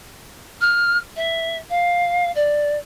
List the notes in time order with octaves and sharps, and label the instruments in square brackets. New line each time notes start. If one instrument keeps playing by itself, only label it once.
[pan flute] F6
E5
F5
D5